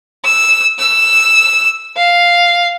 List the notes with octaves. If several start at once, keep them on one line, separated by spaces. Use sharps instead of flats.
E6
E6
F5